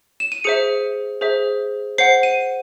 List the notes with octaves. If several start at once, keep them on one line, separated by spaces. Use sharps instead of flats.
E7
D#7
G#4 C5 E5 C#7
G#4 C5 E5
C5 F#5 C7
D#7